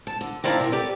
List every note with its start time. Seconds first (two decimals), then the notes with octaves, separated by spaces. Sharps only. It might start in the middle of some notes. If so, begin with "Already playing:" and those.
0.07 A5
0.21 D3
0.44 C4 D4 E4 D5 F5 A#5
0.60 C3 A#4
0.72 G4 A4 B4 D5